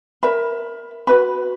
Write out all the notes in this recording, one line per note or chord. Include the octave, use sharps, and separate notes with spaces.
A#4 E5 B5
F#4 B4 E5 B5